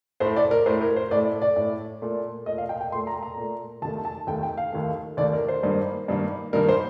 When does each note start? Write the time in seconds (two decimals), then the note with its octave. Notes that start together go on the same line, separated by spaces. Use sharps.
0.20 A2 A3 C5
0.36 D5
0.51 A#4
0.66 A2 A3 C5
0.81 A#4
0.96 C5
1.11 A2 D5
1.16 A3
1.42 D5
1.56 A2 A3
2.02 A#2 A3
2.46 A#2 A3 D#5
2.58 F5
2.69 G5
2.81 G5
2.92 A#2 C6
2.95 A3
3.07 A#5
3.23 A#5
3.37 A#2 A3
3.82 D#2 D#3 A3 A5
4.05 A5
4.27 D#2 D#3 A3 G5
4.43 G5
4.57 F5
4.72 D#2 D#3 A3
5.17 D#2 D#3 A3 D5
5.33 A#4
5.48 C5
5.63 G2 D#3 A#3
6.08 G2 D#3 A#3
6.53 G2 D#3 A#3 A#4
6.68 C5